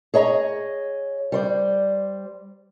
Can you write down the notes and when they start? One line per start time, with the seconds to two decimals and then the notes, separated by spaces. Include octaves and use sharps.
0.14 G#4 C#5 D#5 A#5
1.32 G3 C5 D5